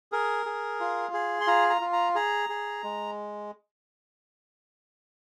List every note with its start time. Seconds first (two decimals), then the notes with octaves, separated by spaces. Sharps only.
0.12 G#4 A#4
0.46 G#4
0.80 F4
1.14 G#4
1.41 C6
1.47 F4 A#5
1.70 A#5
1.81 F4
1.93 A#5
2.15 G#4 A#5
2.49 G#4
2.83 G#3